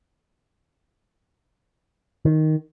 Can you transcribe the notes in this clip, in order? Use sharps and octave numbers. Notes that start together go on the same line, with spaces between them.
D#3